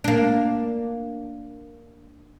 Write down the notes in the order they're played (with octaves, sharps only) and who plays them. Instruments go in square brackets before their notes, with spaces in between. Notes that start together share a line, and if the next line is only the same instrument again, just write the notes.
[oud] A#3 D4